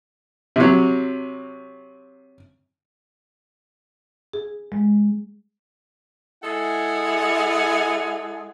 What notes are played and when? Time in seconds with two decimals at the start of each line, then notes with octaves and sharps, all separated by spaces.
0.56 C3 F#3
4.33 G#4
4.72 G#3
6.42 G#3 E4 A4 F#5 G#5